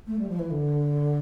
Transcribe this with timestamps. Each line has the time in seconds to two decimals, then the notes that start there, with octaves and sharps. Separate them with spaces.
0.07 A3
0.19 G3
0.28 F3
0.39 E3
0.50 D3